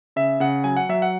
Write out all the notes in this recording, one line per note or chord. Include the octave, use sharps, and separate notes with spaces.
C#3 E5
C#3 F#5
F#3 G#5
F#5
F#3 E5
F#5